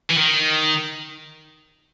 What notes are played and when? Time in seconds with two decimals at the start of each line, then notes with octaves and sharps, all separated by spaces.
0.10 E3
0.17 D#3